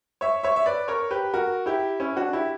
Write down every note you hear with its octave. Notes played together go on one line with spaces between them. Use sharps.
C#5 E5
C#5 E5
E5
B4 D5
A#4 C#5
G4 B4
F#4 A#4
E4 G4
C#4 E4
D4 F#4
E4 G4